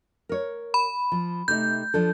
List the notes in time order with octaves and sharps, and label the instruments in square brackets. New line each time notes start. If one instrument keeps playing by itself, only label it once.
[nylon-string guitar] A#4 C#5
[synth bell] B5
[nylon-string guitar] F3
[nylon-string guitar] C3 A3 D#4 [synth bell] G6
[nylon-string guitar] F3 D4 A4